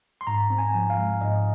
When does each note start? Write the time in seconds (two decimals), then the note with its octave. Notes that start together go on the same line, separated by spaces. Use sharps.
0.21 C6
0.27 G#2 A#5
0.50 C4
0.58 G#5
0.74 F3
0.90 F5
0.98 G#3
1.21 G#2 D#5